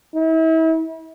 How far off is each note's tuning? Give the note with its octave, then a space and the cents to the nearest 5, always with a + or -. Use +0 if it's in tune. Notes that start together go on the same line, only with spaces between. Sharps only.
E4 -35